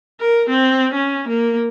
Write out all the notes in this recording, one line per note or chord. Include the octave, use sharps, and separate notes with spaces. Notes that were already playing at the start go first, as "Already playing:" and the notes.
A#4
C4
C#4
A#3